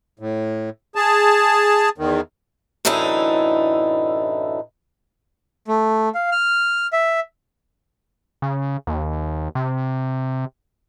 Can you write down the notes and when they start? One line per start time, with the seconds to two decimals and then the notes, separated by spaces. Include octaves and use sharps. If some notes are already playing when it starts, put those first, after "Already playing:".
0.19 A2
0.95 G#4 A5
1.98 E2 D#3
2.85 F#2 A2 D3 E3 D#4 E4
5.68 A3
6.15 F5
6.32 F6
6.93 E5
8.42 C#3
8.87 D#2
9.55 C3